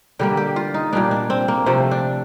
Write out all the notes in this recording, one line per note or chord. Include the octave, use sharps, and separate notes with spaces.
D3 G3 A#3 G4
G4
F4
D#4
A#2 G3 A#3 D4
D4
C4
A#3
C3 F3 A3 C4
D4